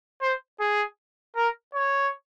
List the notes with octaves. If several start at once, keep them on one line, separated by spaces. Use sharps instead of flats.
C5
G#4
A#4
C#5